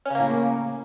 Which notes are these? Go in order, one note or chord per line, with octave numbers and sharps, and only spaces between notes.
A2 C#3 A#3 C#4